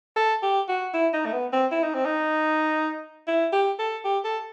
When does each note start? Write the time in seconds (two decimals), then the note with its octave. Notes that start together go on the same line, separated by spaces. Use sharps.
0.16 A4
0.42 G4
0.68 F#4
0.94 E4
1.13 D#4
1.26 A3
1.33 B3
1.53 C4
1.71 E4
1.83 D#4
1.94 C4
2.05 D#4
3.27 E4
3.53 G4
3.79 A4
4.04 G4
4.24 A4